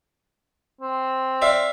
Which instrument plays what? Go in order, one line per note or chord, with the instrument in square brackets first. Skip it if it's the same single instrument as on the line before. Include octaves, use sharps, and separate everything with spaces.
[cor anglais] C4
[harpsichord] D5 E5 F5